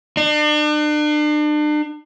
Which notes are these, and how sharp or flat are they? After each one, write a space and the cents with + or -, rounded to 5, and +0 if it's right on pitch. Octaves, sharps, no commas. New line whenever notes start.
D4 +40